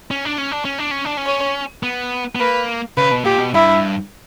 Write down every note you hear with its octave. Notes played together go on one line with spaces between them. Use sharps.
C#4
D4
C#4
D4
C#4
D4
C#4
D4
C#4
C#5
B3
B3
A#3 B4
C#3 B4
B2
A#2 G4
B2
G2 E4